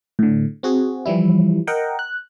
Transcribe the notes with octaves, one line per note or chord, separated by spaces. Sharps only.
A2 D3
C4 F#4 G#4
E3 F3 G3 E4
A#4 D#5 F#5 G5
F#6